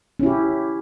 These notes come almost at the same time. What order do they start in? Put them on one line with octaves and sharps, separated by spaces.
C#4 E4 G4